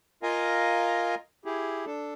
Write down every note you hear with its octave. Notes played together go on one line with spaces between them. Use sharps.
F4 A#4 D#5 F5 G#5 A#5
E4 G4 G#4
D4 A4